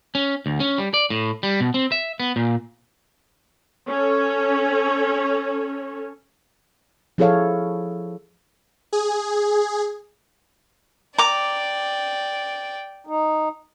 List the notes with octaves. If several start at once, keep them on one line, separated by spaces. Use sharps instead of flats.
C#4
D2
C#4
G3
D5
A2
G3
B2
C4
E5
B3
A#2
C#4 A4 C#5
F3 E4 G#4 A4 C#5 F5
G#4
D5 G5 A#5 D6
D#4